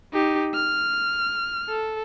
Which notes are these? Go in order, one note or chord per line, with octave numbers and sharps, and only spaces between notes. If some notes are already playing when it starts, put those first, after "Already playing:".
D#4 G4
F6
A4